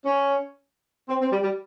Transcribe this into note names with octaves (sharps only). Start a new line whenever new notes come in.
C#4
C4
C4
G3
G3